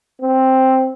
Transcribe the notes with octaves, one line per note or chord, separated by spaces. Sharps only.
C4